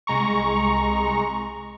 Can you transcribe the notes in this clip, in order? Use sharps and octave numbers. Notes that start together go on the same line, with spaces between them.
C2 G#3 A#5 C#6